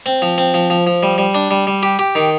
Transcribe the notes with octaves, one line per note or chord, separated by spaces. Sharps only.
C4
F3
C4
F3
F3
F3
G3
G3
D4
G3
G3
G4
G4
D#3